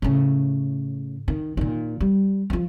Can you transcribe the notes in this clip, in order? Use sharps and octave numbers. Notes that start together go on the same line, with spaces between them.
A2 C#3
D#3
A#2 D#3
G3
F3 F4